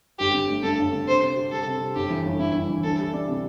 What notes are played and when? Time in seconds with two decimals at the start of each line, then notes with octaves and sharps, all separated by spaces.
0.19 G1 G4
0.34 D3
0.49 A3
0.63 G2 A4
0.79 G1
0.93 D3
1.08 C3 C5
1.22 C4
1.36 G4
1.51 G3 A4
1.66 C3
1.81 C4
1.95 G1 G4
2.10 E3
2.25 G1
2.39 G2 E4
2.54 G1
2.69 E3
2.84 D2 A4
2.99 G3
3.13 D4
3.28 C3